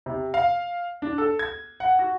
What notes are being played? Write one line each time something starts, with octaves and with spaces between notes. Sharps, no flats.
C3
F5
D4
A4
G#6
F#5
F#4